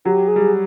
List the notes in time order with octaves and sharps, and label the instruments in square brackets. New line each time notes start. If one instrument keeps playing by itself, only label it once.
[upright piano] F#3 [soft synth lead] G4
[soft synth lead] G#4
[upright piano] G3